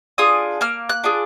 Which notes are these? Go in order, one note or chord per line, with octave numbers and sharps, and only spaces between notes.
D4 F4 G#4 D#6
A#3 F6
F#6
D4 F4 G#4